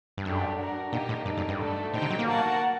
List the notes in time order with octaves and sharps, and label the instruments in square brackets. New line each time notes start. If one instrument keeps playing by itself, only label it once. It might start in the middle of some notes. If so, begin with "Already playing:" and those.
[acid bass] G2
[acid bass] F#2 [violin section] A3 D4 G4
[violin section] D4 F#4 A#4
[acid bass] A#2 [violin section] A#3 D#4 G4 A#4 D#5
[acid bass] A2
[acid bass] G2 [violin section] D#4 A4 D5
[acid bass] F#2
G2
[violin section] A3 D4 F#4 A4
[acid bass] A2 [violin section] D#4 G4 C5 G5
[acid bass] D3
F#3
A#3
[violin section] F#4 A#4 F#5 A5